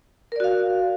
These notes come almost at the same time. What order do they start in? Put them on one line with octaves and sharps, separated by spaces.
A#4 D5 F#4 F5